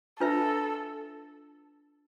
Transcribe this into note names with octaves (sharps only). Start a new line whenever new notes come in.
D4 F4 A4 B4 E5